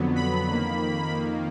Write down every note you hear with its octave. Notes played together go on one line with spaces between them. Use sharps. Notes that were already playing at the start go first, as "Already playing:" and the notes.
Already playing: F2 D3 F#3 B3
B5
F2 D#3 A#3